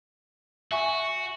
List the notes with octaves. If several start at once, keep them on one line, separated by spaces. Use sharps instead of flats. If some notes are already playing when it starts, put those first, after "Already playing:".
F#4 E5 G#5 C#6